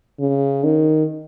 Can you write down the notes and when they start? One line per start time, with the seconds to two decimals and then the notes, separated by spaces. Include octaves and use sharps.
0.20 C#3
0.64 D#3